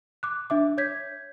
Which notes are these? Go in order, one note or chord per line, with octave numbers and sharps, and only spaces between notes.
D6 F#6
D4 E5 D6
C#5 G6 G#6 B6